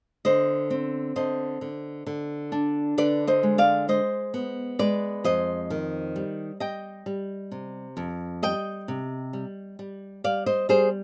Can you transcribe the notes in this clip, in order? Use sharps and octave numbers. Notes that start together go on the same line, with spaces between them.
D3 C5 D#5
C4
D3 C5 D#5
D3
D3
D4
D3 B4 D5
C5 D#5
G#3
D5 F5
G#3 C5 D#5
B3
G#3 B4 D5
F2 C5 D#5
D#3
G3
G3 D#5 G5
G3
C3
F2
G3 D#5 G5
C3
G3
G3
G3 D5 F5
C5 D#5
G3 G#4 C5